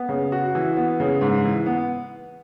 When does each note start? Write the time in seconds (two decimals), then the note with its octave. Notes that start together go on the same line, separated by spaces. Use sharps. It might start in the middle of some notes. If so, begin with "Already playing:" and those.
Already playing: B3
0.09 C#3
0.32 F#4
0.55 E3
0.77 B3
1.00 C#3
1.21 G#2
1.44 E3
1.66 B3